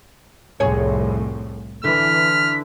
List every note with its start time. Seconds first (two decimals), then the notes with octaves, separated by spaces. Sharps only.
0.60 C2 F2 A2 G#4 C#5
1.84 D3 E3 F6 B6